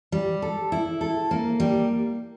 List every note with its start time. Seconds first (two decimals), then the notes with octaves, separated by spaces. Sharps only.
0.12 G3
0.42 A4
0.72 E4
1.01 A4
1.31 A#3
1.60 G3